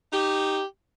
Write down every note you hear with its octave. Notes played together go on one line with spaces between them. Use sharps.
D#4 G4